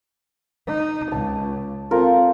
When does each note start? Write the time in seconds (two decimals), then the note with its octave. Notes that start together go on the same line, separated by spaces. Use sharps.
0.67 D#4
1.12 C#2 A5
1.91 C4 F4 A4 A#4